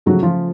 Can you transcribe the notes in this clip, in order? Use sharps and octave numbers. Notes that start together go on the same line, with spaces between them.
C#3 F3 F#3 A3 F#4
F3 F4